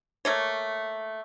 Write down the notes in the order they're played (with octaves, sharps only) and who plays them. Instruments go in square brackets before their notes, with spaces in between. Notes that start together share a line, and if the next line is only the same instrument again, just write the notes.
[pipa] A3 A#3 C#5